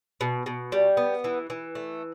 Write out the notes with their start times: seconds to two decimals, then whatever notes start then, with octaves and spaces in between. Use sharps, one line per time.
0.21 B2
0.46 B2
0.72 G3
0.97 B3
1.24 E3
1.50 E3
1.75 A3